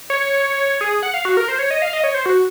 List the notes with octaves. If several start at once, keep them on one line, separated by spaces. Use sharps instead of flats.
C#5
G#4
F#5
F5
F#4
A#4
C5
C#5
D#5
F5
D#5
C#5
C5
F#4